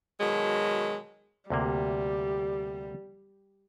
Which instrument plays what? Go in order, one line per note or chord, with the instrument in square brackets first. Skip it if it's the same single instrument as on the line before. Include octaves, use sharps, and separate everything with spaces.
[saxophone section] B2 D#3 F#3 G#3
[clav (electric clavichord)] D2 C3 A#3 [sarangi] G3